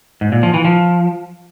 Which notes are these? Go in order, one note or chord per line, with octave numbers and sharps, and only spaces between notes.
G#2
A#2
F3
E3
F3